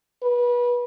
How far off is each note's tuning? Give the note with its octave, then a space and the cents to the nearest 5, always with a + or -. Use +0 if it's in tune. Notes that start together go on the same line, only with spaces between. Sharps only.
B4 -25